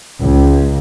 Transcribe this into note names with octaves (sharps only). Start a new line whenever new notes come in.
C#2